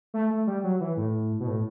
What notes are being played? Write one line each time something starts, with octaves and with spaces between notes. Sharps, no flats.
A3
A3
G3
F#3
E3
A2
B2
A2